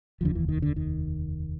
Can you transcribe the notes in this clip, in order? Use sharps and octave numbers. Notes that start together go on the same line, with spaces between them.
F1 D#2 D3 F3
E3
D#3
D3
D#3